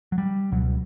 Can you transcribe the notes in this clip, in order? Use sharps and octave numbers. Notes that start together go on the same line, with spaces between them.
F#3
G3
C#2 B2 F#3